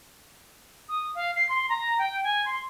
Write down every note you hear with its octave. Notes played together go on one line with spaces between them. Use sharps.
D#6
F5
C7
C6
A#5
G5
G#5
C6